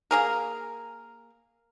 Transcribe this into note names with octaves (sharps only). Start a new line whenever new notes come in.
A#3 G#4 A#4